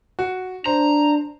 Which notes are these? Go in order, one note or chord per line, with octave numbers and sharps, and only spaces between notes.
F#4
D4 C5 A#5